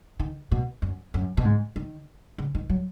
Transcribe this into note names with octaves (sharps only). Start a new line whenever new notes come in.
D#3
B2
F#2
F#2
B2
G#2
D#3
C#3
D#3
F#3